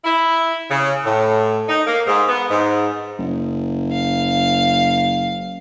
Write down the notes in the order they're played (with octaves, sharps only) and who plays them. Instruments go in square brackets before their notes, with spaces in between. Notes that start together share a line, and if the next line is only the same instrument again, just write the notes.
[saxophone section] E4
C#3
A2
D#4
A#3
G#2
B3
G#2
[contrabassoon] F#1
[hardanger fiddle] F5